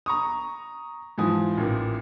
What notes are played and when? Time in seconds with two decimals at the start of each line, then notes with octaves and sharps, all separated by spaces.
0.06 A#5 C#6 D#6
1.18 G#2 E3 F3 G#5 D#6
1.57 A1 A#2